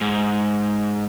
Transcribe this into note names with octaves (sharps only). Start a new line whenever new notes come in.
G#2